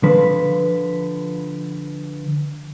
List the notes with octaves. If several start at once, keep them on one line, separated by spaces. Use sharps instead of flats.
D3 F3 B4